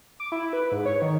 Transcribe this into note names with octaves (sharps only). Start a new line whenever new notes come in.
D6
E4
B4
G#2
C#5
D#3